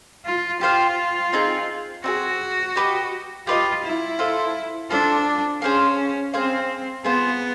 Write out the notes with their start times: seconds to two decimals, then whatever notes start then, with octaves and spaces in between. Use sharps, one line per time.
0.25 F4
0.61 F4 G4 C5 F5
1.33 C4 D#4 G#4
2.04 C4 D#4 F#4 G#4
2.76 G4 B4 D#5
3.47 F4 G4 B4 D#5
3.83 E4
4.19 F4 A4 C5
4.90 D4 F4 A4 C5
5.62 C#4 G#4 C5 F5
6.34 C4 G#4 C5 F5
7.04 B3 F4 G#4 C5